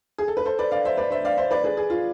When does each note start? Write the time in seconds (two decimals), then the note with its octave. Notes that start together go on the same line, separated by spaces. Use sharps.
0.18 G#4
0.28 A4
0.37 B4
0.46 A4 C5
0.59 B4 D5
0.71 D5 F5
0.85 C5 E5
0.97 B4 D5
1.11 C5 E5
1.25 D5 F5
1.37 C5 E5
1.51 B4 D5
1.64 G#4 B4
1.77 G#4
1.90 F4